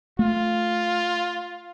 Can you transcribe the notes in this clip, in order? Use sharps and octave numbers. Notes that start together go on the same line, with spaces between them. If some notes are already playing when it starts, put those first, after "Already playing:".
A3 F4